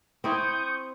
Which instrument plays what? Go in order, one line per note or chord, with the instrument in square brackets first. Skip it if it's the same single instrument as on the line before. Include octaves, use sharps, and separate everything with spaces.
[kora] C4 E4 [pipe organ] C#6 D#6 G6